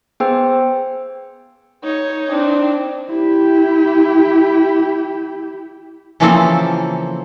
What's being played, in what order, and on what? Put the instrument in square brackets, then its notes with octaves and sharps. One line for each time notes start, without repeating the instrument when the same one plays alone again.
[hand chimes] B3 G#4 C5 G5 E6
[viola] D#4 [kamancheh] C#5
[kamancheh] C4 D4
[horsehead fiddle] E4 G4
[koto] C#3 E3 F3 A#3 C4 A4